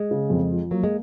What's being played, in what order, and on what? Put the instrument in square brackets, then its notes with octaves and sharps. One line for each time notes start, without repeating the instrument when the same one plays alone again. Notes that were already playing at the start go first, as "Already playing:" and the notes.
Already playing: [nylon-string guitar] G#3
[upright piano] C#3
F2
F3
[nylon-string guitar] F#3 [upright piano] A#3
[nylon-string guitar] G#3